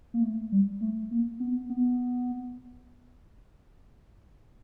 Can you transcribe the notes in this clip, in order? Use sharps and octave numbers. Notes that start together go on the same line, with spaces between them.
A#3
A3
G3
A3
A#3
B3
B3